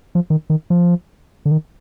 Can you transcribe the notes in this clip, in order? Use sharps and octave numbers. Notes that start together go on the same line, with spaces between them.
F3
D#3
D#3
F3
D3
D#3